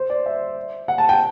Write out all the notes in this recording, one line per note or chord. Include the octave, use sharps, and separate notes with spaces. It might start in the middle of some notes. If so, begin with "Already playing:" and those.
Already playing: C5
D5
E5
F#5
A5
G5